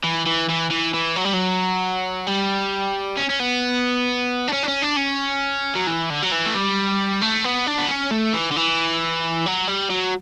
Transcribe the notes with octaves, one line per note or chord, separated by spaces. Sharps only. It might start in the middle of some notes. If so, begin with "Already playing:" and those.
E3
E3
E3
E3
E3
F#3
G3
F#3
G3
C#4
C#4
B3
D4
C#4
D4
C#4
D4
C#4
F#3
E3
D3
F#3
E3
A3
G3
A3
B3
D4
B3
C#4
A3
E3
D3
E3
F#3
G3
F#3